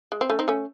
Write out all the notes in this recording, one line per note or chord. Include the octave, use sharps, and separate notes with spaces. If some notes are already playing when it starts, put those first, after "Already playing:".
G#3
C4
A3 C#4
C4 D#4
A3 C#4